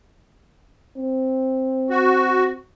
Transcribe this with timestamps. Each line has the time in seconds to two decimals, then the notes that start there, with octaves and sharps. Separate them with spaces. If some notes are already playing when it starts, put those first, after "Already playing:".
0.96 C4
1.90 F#4